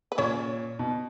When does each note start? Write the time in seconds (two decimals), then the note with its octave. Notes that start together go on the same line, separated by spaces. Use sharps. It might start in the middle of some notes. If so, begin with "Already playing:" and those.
0.12 B4
0.18 A#2 C#4 C#5
0.79 B2